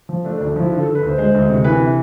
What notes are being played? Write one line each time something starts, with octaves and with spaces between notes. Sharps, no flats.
F3
A3 D4
D4
D2
D4
F3 E4
D3 F4
A4
D3
B4
D2 C5
G#3 C5
D2
C3
E3 B4
C3